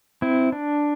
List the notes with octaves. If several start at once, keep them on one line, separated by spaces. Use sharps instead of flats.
C4 E4
D4